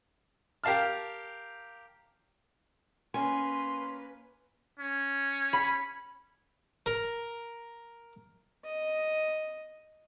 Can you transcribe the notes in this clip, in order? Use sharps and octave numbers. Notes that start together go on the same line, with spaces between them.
G4 A#4 F5 A5 F6
A#3 C#4 B4 G#5 C6
C#4
B5
A#4
D#5